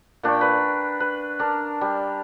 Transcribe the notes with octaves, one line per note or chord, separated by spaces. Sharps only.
A#2 D4 G5 C#6
B4
B4
D4 A#4
G3